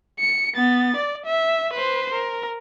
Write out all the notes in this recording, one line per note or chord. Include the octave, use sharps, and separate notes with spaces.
C#7
B3 A6
D5
E5
B4 C5
A#4